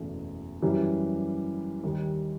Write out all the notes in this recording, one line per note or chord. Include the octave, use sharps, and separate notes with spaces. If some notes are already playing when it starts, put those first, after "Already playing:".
Already playing: F#1 E2 B2 A3
F#2 E3 G3
D#2 D#3 G3